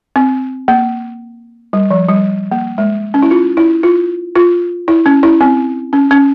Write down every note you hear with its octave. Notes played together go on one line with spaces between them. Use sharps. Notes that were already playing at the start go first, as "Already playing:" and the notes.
C4
A#3
G3
F3
G3
A#3
G#3
C#4
E4
F4
E4
F4
F4
E4
C#4
E4
C4
C#4
C#4